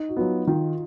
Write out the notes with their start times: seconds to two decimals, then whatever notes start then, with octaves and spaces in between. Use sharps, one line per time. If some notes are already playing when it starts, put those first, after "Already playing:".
Already playing: D#4
0.09 F#4
0.17 F#3 B3 F4
0.47 D#3 F4